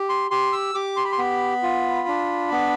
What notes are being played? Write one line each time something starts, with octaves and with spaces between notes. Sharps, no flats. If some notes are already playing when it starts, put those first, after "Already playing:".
Already playing: G4
C6
G4 C6
E6
G4 D6
C6
B5
C6
B3 B5
F4
D4
B3